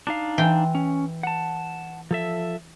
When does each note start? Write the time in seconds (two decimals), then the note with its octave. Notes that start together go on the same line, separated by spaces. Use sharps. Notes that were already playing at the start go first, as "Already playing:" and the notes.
0.07 D4 D#4 F5
0.38 E3 G5 C6
0.75 C#4
1.23 F#5 A5
2.11 F3 A4 E5